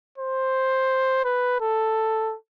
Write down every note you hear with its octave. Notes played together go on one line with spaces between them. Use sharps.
C5
B4
A4